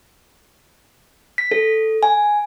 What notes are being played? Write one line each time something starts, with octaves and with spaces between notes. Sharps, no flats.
B6
A4
G#5